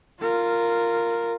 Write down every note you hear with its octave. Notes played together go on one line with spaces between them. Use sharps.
F4 A#4